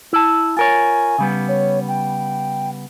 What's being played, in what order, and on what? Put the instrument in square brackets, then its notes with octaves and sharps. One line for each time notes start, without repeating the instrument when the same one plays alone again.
[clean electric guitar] E4 A5
[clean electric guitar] F4 A#4 C#5 [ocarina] G#5
[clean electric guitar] C#3 G3 B3
[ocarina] C#5
G5